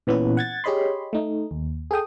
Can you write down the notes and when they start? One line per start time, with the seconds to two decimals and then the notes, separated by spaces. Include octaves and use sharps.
0.07 A#2 E3 B3 C#4 B4
0.37 F#5 G#6 A6
0.64 G4 G#4 C#5 D#5 B5 C6
1.13 A3 D#4
1.51 D#2
1.91 G#4 A4 G5 D#6